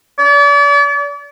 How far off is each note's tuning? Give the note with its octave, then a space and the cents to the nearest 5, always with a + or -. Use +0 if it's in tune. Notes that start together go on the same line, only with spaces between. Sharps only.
D5 -40